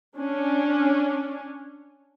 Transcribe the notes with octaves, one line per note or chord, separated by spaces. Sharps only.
C#4 D4